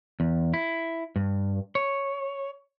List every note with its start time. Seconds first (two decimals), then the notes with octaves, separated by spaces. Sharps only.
0.20 E2
0.54 E4
1.16 G2
1.75 C#5